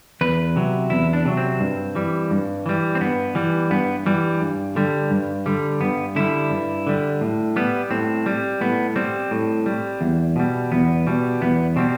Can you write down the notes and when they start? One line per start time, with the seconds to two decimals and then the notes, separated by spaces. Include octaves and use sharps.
0.21 E2 B4
0.56 C3 F#3
0.90 E2 E4
1.13 D4
1.25 C3 F#3
1.37 C4
1.60 G2
1.95 E3 G3
2.31 G2
2.66 E3 G3
2.95 C4
3.01 G2 B3
3.35 E3 G3
3.70 G2 B3
4.06 E3 G3
4.41 G2
4.76 D3 G3
5.11 G2
5.46 D3 G3
5.81 G2 B3
6.16 D3 G3 E4
6.51 G2
6.87 D3 G3
7.21 A2
7.56 G3 B3
7.91 A2 C4
8.26 G3
8.61 A2 B3
8.96 G3 C4
9.31 A2
9.66 G3
10.01 E2
10.36 B2 G3
10.72 E2 B3
11.07 B2 G3
11.41 E2 B3
11.76 B2 G3 C4